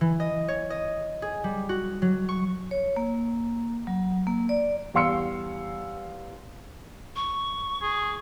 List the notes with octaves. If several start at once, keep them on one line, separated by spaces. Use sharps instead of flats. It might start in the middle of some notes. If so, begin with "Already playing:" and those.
E3
D#5
C#5
D#5
G#4
G3
F#4
F#3
C#6
C#5
A#3
F#3
A#3
D5
E2 G3 F5 C6 E6 C#7
C#6
G#4